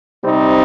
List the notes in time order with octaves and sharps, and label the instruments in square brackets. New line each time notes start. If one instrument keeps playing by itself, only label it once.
[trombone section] C3 G3 C4 D#4